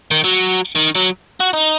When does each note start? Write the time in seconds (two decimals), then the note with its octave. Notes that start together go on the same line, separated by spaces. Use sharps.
0.11 D#3
0.24 F#3
0.75 D#3
0.95 F#3
1.40 F#4
1.53 D#4